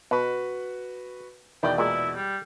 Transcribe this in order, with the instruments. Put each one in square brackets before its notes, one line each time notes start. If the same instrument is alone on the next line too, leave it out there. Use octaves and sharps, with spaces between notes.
[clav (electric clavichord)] B2 [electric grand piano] F#4 B4 B5
[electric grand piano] E2 B2 D5 [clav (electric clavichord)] D#3 E4 [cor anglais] G5
[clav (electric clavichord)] A#2 G#3 [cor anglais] E4
[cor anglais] G3